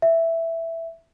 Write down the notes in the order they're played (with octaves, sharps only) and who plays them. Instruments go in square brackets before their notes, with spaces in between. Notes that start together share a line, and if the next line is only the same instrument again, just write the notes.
[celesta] E5